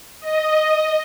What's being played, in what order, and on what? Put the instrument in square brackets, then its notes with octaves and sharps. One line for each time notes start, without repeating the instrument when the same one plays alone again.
[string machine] D#5